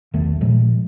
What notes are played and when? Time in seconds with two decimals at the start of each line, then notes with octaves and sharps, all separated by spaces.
0.13 B1 E2 D#3 A3
0.41 A#2 F3 G#3 A3